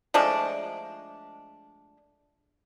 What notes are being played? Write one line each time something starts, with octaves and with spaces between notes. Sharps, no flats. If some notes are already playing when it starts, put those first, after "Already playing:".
F3 G#3 A3 D4